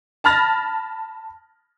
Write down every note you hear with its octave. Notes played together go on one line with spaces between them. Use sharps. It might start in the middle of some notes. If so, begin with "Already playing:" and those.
A5 B5 F6 A6 A#6